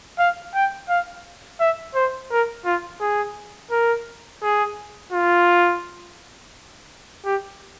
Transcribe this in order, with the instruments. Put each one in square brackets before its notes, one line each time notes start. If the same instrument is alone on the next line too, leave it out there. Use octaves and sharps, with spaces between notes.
[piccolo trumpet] F5
G5
F5
E5
C5
A#4
F4
G#4
A#4
G#4
F4
G4